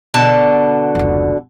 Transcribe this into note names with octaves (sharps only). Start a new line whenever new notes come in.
B2 D3 A5
F1 C#2